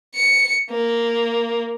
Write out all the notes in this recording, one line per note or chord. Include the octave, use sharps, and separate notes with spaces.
C#7
A#3